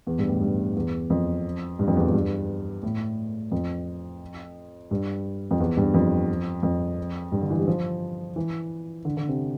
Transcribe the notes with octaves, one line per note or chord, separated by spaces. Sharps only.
E2
G2
A2
G2
E2
F2
G2
F2
E2
F2
G2
A2
F2
G2
F2
E2
G2
F2
F2
G2
D3
E3
G3
F3
E3
D3
D3
C3